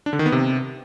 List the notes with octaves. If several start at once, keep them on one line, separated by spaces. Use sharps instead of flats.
D4
D3
D#3
B3
C3